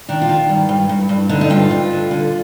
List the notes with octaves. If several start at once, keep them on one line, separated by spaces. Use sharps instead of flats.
D#3 D4
F4
D#3
G2
G2
G2
G2
D3 D#4
D#4
G2 F4
G2
D3
D3